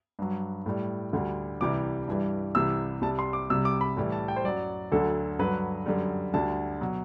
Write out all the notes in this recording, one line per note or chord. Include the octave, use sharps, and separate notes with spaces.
G2 F#3
A2 G3
D2 D3 G3
C2 C3 E3 G3 D6
G2 E3 G3
C2 C3 E3 G3 E6
C2 C3 G3 A5
C6
D6
C2 C3 G3 E6
D6
B5
A2 E3 G3
A5
G5
C5
F#2 F#3 D5
D2 D3 F#3 A4
G2 D3 F#3 B4
F#2 D3 G3
D2 D3 G3 A5
B2 F#3